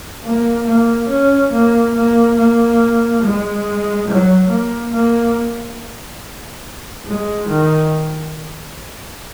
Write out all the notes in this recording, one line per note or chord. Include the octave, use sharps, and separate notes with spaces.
A#3
A#3
C#4
A#3
A#3
A#3
G#3
F#3
A#3
A#3
G#3
D#3